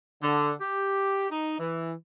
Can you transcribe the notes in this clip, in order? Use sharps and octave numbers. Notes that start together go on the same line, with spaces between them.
D3
G4
D#4
E3